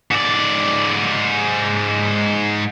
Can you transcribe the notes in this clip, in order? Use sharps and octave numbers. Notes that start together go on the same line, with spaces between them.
G#2 D5